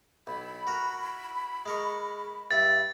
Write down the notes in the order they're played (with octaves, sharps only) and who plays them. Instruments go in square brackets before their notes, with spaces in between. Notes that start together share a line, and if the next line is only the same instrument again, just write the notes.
[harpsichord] B1 [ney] B5
[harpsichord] F#4 A#4
G#3 A#4 C#6
[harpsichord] G2 E4 [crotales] A6